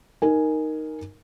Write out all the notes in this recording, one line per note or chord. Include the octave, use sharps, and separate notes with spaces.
D#4 A#4 G#5